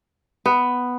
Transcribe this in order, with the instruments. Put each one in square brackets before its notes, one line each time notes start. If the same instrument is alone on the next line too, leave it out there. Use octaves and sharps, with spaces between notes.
[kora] B3